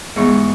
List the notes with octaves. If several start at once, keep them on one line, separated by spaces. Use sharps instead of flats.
G#2 E3 G#3 B3 C#6